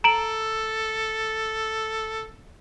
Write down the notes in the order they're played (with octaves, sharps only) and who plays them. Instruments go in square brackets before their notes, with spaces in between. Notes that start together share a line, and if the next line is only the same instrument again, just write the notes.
[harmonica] A4 [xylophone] A#5 D7 F#7